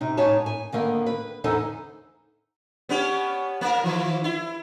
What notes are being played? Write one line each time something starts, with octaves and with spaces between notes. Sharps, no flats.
C3 D#4
G#2 B3 D#4 C#5 G#5 A5
G#5
D3 D#3 A#3 B3
B4
E2 D3 D#4 A4 C5 G#5
B3 C#4 G4
A#3 A#4
D#3 F3
E4